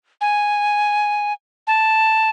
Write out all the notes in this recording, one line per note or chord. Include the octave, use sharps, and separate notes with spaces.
G#5
A5